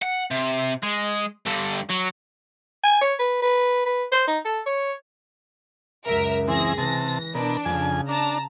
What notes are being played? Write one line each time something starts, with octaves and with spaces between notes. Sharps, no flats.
F#5
C3
G#3
G2 D3
F#3
G#5
C#5
B4
B4
B4
C5
D#4
A4
C#5
C#2 F#2 A#4 E5
E3 C4 G#4 A#6
C3 E3 A5 A#6
B2 D4 A#4
F2 C#3 G#5
D4 A5 A#5